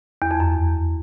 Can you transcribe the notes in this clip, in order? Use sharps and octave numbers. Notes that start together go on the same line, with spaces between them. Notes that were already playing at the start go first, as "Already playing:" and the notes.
E2
F2
F#2